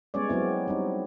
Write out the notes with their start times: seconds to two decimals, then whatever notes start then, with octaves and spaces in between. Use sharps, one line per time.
0.14 G3 G#3 B3 C#4 C#5 D5
0.29 F#3 G#3 B3 C4 E4
0.68 G3 C4 D#4